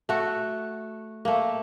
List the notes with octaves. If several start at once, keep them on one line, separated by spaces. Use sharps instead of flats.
A3 F#4
A3 A#3